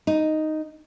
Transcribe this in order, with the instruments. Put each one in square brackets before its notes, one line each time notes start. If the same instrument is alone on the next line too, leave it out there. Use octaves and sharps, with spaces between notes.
[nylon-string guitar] D#4